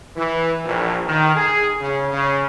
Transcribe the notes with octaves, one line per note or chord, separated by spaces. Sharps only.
E3
A#1
D#3
G#4
C#3
C#3